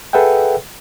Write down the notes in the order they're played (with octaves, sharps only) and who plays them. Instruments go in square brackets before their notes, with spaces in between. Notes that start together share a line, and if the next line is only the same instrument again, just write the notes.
[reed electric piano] G#4 A4 B4 E5 F#5 G5